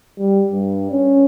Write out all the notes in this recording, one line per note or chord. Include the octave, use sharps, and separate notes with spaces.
G3
G2
C#4